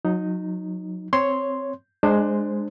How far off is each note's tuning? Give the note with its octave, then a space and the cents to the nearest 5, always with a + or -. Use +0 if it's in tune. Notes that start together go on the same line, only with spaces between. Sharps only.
F#3 -25 D#4 +0
C4 +0 C#5 +0 C6 +0
G#3 +0 D4 +25 C5 +0